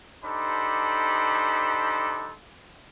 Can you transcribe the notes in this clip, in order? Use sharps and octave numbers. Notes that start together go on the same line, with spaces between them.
D4 D#4 G4 A4 C5 B5